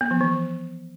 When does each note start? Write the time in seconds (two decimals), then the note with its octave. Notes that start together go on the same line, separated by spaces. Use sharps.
0.01 B3
0.11 F3
0.21 E3